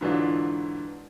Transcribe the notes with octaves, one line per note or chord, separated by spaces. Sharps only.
G#2 D3 E3 F#3 D4 F4